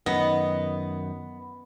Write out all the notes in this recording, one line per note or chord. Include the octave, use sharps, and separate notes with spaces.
F#2 D#3 B3 D#5